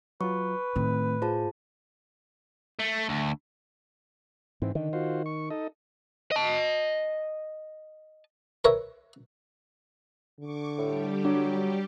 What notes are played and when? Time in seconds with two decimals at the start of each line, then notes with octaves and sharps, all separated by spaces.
0.21 F#3 F4 B4 C#6
0.76 A2 D#3 A3 C4
1.22 F4 G#4 C5 A5
2.80 A3
3.09 D2
4.62 G#2 E3 C4
4.75 D3 D#3
4.93 F4 F#4 C5
5.26 C#6
5.50 D#4 A4 D#5
6.32 D#5 A5
8.65 A#4 B4 C#5 E5
10.40 D3 C#6 D6
10.78 A2 G3 G4
11.25 F#3 D4